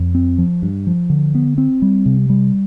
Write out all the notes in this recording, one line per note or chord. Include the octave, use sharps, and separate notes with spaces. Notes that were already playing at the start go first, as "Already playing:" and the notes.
Already playing: F2
C4
F3
G2
F3
D3
B3
C4
G3
C3
G3